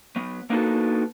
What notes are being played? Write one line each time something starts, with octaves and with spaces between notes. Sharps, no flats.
F#3 B3
A#3 B3 D4 D#4 F#4 A4